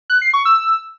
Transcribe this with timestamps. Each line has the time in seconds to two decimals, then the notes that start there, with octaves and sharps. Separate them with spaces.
0.10 F#6
0.22 C7
0.33 C#6
0.45 E6